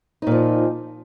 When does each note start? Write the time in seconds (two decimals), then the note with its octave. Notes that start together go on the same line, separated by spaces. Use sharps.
0.22 D#4
0.27 A#2
0.31 F3